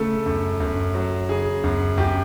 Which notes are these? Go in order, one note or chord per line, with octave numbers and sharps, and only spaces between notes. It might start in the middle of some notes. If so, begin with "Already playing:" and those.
Already playing: C#3 A3 A4
F#2
F#2
F#3
C#3 G#4
F#2
F#2 G4